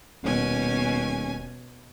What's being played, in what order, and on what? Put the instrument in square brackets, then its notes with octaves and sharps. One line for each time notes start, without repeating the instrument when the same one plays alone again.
[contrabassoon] D#1 [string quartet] B2 C#4 G#5